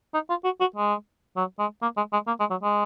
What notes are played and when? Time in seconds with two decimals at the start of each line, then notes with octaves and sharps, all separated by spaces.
0.14 D#4
0.30 F4
0.44 F#4
0.61 F#4
0.76 G#3
1.37 F#3
1.59 G#3
1.82 A#3
1.97 G#3
2.13 G#3
2.27 A#3
2.40 G#3
2.50 F#3
2.63 G#3